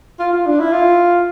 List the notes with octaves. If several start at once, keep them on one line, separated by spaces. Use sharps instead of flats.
F4
F4
D4
E4
F4